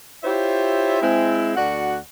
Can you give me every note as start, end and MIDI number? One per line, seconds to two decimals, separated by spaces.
0.23 1.00 64
0.23 1.00 65
0.23 1.00 67
0.23 1.00 72
0.23 1.00 73
0.23 1.00 76
1.02 1.54 56
1.02 1.54 60
1.02 1.54 64
1.56 1.97 38
1.56 1.97 66
1.56 1.97 74
1.56 1.97 78